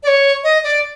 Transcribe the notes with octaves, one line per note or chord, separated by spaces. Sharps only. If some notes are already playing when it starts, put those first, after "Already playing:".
D5
C#5
D#5
D5